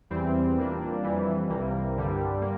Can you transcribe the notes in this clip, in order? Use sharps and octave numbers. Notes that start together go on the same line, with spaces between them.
E2 E3 G3 C4
A#2 G3 A#3 D4
F2 E3 G3
C2 C3 G3 A#3
G2 D3 G3
A#3